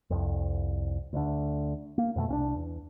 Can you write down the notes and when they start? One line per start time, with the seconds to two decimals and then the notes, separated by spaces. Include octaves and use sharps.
0.10 C2 F2
1.13 D2 D3
1.98 A#3
2.16 F2 B2 G#3 A3
2.28 C2 C#4 D4
2.56 E2